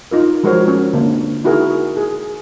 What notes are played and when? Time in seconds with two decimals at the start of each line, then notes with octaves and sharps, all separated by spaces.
0.11 D#4 F4 A#4
0.44 F3 G#3 F#4 A#4 C5 C#5
0.68 C#4
0.93 D3 A#3 C4 D4
1.44 D#4 E4 F#4 G#4 A#4
1.97 G#4